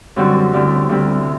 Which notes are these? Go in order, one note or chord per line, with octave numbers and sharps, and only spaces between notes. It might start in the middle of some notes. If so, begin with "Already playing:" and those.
F#2 D3 G3 C4 F#4
D2 D3 G3 C4 E4
D2 D3 G3 C4 E4
C3